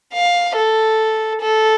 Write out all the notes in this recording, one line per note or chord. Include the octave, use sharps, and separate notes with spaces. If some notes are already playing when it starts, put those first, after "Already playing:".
F5
A4
A4